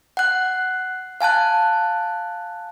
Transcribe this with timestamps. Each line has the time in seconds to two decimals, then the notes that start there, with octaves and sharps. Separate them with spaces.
0.17 F#5 F#6
1.21 F5 G#5 A5 F#6